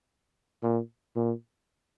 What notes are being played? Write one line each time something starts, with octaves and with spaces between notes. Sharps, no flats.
A#2
A#2